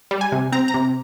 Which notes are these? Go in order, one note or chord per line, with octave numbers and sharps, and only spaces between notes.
G3
G#5
C3
C4 A#5
A#5
C3